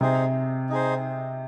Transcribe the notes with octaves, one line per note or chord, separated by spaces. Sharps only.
C3 D#4 G#4 C5
D#4 G#4 C5